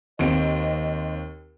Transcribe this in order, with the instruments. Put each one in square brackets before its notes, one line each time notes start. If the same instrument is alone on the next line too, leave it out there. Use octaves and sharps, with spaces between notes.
[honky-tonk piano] D#2 C4 D7 [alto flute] D#5